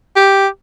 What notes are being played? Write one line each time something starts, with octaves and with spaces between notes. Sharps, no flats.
G4